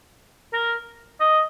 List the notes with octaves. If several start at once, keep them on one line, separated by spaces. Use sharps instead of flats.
A#4
D#5